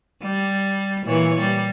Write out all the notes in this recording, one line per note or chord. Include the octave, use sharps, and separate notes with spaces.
G3
A#2 E3 C#5
G3